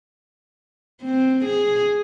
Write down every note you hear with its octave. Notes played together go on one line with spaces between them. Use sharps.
C4
G#4